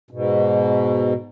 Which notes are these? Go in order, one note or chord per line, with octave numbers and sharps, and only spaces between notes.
G#2 B2